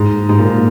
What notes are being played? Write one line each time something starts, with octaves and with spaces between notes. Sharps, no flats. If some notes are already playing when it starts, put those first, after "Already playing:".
Already playing: G#2
G#2
A#2